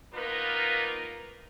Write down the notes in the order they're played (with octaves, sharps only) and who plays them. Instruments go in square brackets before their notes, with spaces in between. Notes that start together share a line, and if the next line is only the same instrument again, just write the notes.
[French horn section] A#3 B3 D#4 F4 A#4 B4